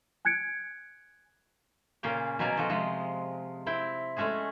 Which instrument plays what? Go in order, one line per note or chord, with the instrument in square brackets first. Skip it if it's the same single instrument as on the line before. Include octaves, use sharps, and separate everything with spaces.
[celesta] G#5 F#6 G#6 C#7 D7
[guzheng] A#2 C#3 A#3 C#4 F5 G5
B2 F#3 C#4 D5 G#5 A#5
F3 F#4 A4 D#5
C3 F3 G#3
C4 E4 G5
G#3 A3 C#4 F#4 G#4